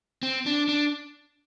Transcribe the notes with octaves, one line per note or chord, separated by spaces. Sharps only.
C4
D4
D4